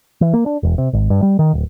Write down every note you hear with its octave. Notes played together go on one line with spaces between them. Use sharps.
E3
A#3
D4
E1
C3
G#1
G2
G3
D#3
D1